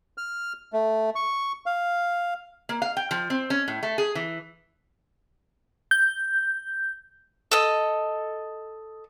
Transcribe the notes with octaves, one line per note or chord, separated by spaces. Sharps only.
F6
A3
C#6
F5
A#3
F5
G5
F3
C4
C#4
A2
A3
G#4
E3
G6
A4 D#5